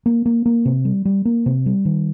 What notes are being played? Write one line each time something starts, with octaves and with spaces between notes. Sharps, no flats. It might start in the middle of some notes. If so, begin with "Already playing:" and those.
A#3
A#3
A#3
C3
G3
G3
A#3
C3
G3
D#3